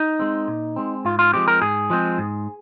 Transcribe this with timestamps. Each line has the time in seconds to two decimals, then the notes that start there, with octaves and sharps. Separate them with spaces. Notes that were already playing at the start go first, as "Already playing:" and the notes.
Already playing: D#4
0.19 G#3 C4
0.48 A#2
0.76 G#3 C4
1.05 G#2 F4
1.19 F4
1.33 F3 G#3 C4 G4
1.48 A#4
1.62 G#2 G#4
1.90 F3 G#3 C4
2.18 G#2